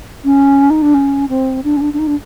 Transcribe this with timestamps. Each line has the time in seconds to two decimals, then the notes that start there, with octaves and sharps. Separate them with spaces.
0.25 C#4
0.70 D#4
0.82 D4
0.94 C#4
1.29 C4
1.64 D4
1.77 C#4
1.81 D4
1.94 D4
1.99 D#4
2.07 D4